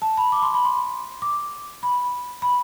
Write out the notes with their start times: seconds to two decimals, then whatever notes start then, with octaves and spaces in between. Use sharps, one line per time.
0.02 A5
0.18 B5
0.32 D6
0.42 C6
0.54 B5
0.65 C6
1.22 D6
1.83 B5
2.42 B5